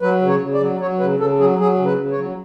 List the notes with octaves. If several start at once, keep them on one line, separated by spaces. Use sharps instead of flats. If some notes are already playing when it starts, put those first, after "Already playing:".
F#3 B4
C#3
C#5
C#3
D5
F#3
F#3 C#5
C#3 B4
C#3 A4
F#3 G#4
F#3 G#4
C#3
B4
C#3
C#5
F#3